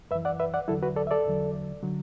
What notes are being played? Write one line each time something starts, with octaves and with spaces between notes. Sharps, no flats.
F#2 E3 B4 E5
D5 F#5
B4 E5
D5 F#5
E2 D3 F#3 E4 A4
F#4 B4
A4 D5
E5
A4 D5
E2 D3 F#3
D3 F#3